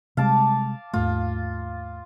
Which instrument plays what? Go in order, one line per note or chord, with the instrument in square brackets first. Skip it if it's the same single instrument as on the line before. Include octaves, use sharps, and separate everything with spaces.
[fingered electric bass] C3 G3 G#3 [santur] F5 A5 D6
[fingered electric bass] D#2 G#2 A3 [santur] F4